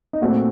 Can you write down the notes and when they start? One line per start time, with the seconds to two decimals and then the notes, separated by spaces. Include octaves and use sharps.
0.13 D#4
0.21 A#2 A3 C4 F#4